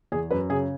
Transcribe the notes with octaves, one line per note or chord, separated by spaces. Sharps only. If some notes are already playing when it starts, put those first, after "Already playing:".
E2 G#4
F#2 B4
C#3 G#4